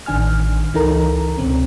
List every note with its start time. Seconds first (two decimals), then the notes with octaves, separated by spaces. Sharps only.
0.06 A1 D#3 D4 G#5 F6
0.74 C#2 E3 D#4 A4 A#4 A#5
1.37 C#2 B2 C4 C#4